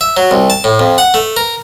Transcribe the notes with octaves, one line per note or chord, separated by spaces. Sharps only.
E5
F#3
C2
A5
A2
F2
F#5
A3
A#4